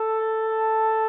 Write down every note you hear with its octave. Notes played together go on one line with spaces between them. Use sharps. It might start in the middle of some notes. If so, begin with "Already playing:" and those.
Already playing: A4